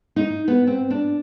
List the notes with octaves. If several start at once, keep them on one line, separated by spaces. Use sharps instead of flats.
D#4
B3
C4
D4